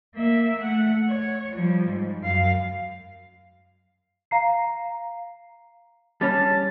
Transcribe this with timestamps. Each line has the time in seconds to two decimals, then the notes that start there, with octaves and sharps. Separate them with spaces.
0.15 A#3 E5
0.58 A3 F#5
1.09 C#5
1.54 F3 G3
1.89 G#2
2.23 F#2 F5
4.31 F5 A#5 C7
6.21 G3 C#4 A5